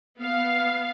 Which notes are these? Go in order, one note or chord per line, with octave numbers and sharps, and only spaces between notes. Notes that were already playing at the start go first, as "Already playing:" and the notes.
B3 F5